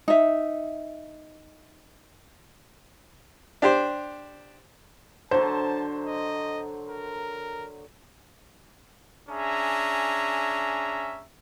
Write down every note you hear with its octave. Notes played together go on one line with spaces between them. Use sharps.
D#4 E5
D4 G4 C5
D3 F#3 C5 A5
D#5
A#4
C#4 D4 G#4 E5 A#5